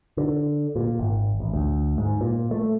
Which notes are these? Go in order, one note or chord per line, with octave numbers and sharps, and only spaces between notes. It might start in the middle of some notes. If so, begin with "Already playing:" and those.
D3
A#2
G#1
A1
D2
G#2
A#2
A3